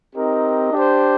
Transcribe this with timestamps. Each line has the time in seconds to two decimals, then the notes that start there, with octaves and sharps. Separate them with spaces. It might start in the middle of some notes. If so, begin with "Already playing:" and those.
0.16 C4 D#4 G4 A#4 D#5
0.72 D4 G4 C5